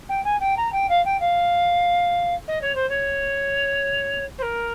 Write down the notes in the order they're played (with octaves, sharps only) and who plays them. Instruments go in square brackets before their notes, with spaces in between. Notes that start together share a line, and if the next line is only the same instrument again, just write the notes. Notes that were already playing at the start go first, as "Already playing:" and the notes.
[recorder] G5
G#5
G5
A#5
G5
F5
G5
F5
D#5
C#5
C5
C#5
C5
A#4